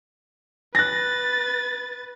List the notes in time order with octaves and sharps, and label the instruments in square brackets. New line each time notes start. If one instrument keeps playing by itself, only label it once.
[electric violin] B4 A6 [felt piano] F#6 A#6